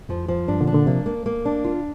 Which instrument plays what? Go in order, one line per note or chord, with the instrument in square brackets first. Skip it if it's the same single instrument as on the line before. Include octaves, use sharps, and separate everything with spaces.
[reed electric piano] F2 [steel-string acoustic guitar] F3
[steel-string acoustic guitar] F3
[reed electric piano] G2 [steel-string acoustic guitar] D4
[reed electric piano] A#2 D3
[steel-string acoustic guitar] D4
[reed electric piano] A#2 D3
[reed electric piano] C3 F3 [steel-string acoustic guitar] A#3
[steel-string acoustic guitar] A#3
A#3
D4
F4